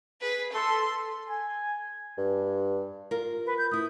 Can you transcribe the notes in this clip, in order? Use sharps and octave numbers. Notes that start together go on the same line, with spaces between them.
G#4 B4
A4 C6
G#5
G2
F4 A#4
B4
G6
A3 E4 D#6